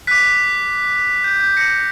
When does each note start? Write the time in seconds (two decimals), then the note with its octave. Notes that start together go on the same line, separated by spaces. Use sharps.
0.07 D6 F#6 B6
1.24 G6
1.40 G6
1.57 A#6 C#7